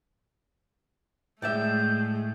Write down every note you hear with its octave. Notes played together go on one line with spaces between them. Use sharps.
A2 G#3 A3 D5 E5 G6